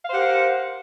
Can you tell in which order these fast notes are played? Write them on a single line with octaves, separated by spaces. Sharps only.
F5 C5 G4 F#5 A#4